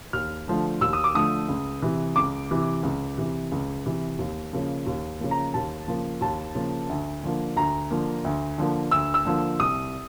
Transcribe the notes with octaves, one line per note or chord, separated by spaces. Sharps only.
D#2 F6
D3 F3 A3
D#2 E6
D#6
D6
D3 F3 A3 D#6
C#2
C3 E3
C#2 D6
C3 E3
C#2
C3 E3
C#2
C3 E3
D#2
C#3 F3 A#3
D#2
C#3 F3 A#3
A#5
D#2 A5
C#3 F3 A#3
D#2 A5
C#3 F3 A#3
D2
D3 F3 A#3
D2 A#5
D3 F3 A#3
D2
D3 F3 A#3
D2 E6
E6
D3 F3 A#3
C2 D#6